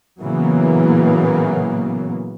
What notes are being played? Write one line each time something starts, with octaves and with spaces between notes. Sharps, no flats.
A#2 C#3 E3 F#3 A#3 B3